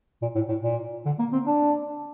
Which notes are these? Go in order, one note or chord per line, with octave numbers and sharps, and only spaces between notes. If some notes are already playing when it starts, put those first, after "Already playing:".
A#2
A2
A2
A#2
D3
A#3
C4
D4